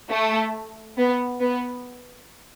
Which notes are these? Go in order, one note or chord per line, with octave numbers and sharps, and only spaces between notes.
A3
B3
B3